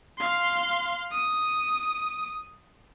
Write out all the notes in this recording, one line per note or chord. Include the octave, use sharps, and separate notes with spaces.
F5 C6
D#6